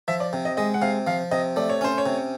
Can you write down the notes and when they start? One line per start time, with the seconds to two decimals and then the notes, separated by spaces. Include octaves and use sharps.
0.08 F3 E5
0.20 D5
0.33 C3
0.45 D#5
0.57 G#3 D#5
0.74 F#5
0.82 C3 F5
1.07 F3 F5
1.31 C3 D#5
1.56 A3 D5
1.70 C#5
1.81 C#4 C5
1.98 C#5
2.06 C3